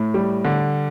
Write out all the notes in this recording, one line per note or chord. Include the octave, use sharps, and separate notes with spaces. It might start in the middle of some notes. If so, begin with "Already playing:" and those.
Already playing: A2
G3
D3